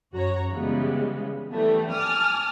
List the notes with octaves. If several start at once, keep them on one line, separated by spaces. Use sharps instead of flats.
F#2 F#4 C#5 A#5
C#3 E3 G3 G#3 B3
E3 G3 A3 B3
G#5 A5 D6 D#6 F6